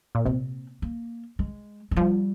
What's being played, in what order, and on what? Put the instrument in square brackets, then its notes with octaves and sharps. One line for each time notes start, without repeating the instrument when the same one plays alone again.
[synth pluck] A#2
[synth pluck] C3 [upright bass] C4
[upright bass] A#3
G#3
G#3
[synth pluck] F3 [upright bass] G3